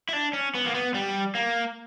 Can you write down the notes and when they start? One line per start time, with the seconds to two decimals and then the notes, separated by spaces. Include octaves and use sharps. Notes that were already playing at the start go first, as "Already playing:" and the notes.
0.09 E4
0.13 D4
0.33 C#4
0.55 B3
0.66 A#3
0.74 B3
0.94 G3
1.35 A#3